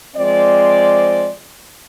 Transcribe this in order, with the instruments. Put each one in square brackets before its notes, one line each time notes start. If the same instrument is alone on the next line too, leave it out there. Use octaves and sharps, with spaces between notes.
[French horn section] F3 G#3 C4 D5